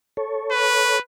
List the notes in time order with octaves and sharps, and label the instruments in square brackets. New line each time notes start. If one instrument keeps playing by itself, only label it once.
[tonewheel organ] A4 C#5
[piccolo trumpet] B4